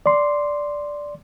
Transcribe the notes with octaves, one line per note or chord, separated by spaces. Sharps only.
D5 C6